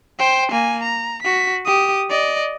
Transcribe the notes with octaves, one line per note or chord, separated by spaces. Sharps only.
C5 G5
A#3 G#5
A#5
F#4 B6
G4 D#6
D5 D#5